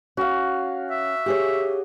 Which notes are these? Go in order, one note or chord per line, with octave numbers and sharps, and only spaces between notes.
C#4 F#4 F5
E5
G4 G#4 C#5